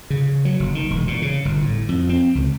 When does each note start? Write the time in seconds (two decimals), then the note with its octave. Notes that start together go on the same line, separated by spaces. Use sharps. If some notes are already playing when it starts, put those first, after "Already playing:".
0.10 C#3
0.45 F#3
0.60 F#1
0.75 D#3
0.90 E1
1.07 A#2
1.22 C#3
1.45 G1
1.62 A2
1.89 F2
2.09 C4
2.35 C#2